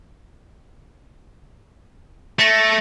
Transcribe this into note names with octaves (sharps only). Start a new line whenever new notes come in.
A3 A#6 C#7 E7